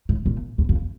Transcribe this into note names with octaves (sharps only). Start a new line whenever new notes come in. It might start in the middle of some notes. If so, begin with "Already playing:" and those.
A2
A#2
E2
F2